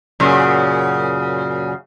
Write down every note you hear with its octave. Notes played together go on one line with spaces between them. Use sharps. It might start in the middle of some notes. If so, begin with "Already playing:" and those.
F#2 A#2 C#3